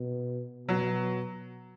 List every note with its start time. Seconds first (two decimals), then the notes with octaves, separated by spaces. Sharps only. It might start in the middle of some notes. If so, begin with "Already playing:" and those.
Already playing: B2
0.68 B2 F#3